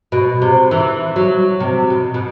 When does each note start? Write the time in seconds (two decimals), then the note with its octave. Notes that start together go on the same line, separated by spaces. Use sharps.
0.12 B2
0.42 C3
0.71 E3
1.16 F#3
1.60 C3
1.90 B2
2.14 B2